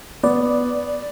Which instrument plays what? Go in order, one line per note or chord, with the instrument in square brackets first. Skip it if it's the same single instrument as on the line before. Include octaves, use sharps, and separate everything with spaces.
[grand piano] B3 [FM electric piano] D5